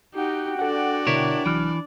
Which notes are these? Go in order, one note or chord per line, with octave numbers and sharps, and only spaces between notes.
D#4 F#4 G4 G5
D4 A4 D5 F#5
B2 D3 E4 A#4 C#5
C2 E3 F#3 F6